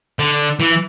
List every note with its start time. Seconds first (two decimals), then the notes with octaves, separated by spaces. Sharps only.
0.19 D3
0.60 E3